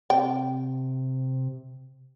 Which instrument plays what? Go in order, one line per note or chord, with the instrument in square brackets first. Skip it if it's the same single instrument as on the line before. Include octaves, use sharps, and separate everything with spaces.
[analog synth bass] C3 [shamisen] G5